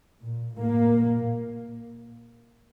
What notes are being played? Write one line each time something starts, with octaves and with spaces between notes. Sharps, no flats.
A#2
A2 A#3
A#2